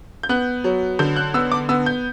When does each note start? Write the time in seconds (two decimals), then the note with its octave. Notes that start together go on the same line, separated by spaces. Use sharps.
0.23 G6
0.29 B3 F#6
0.64 F#3
0.99 D3 G6
1.16 F#6
1.34 B3 E6
1.52 D6
1.69 B3 E6
1.86 G6